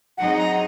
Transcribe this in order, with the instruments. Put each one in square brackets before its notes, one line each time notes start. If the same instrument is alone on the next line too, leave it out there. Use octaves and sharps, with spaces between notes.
[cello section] F#3 C4 D#4 G#4 D#5 [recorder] F#5
[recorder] A#5